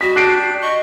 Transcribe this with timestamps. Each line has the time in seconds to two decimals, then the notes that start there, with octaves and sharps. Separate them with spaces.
0.01 G3 F#4 D#5 B6
0.16 D4 G4 D5 F#6 C7 D7
0.62 D#5 C#6